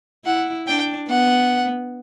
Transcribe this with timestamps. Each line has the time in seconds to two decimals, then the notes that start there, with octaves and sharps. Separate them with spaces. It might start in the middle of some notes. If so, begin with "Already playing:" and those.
0.26 E4 F#5
0.67 D4 G5
1.09 B3 F#5